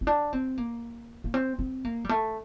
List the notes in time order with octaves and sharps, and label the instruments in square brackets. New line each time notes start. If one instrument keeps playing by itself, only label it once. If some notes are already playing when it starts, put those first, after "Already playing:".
[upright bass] C4
D4
C4
A#3
A#3
C4
C4
A#3
G3
A3